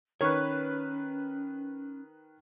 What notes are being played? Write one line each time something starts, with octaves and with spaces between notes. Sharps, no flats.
D#3 C#4 B4 C#5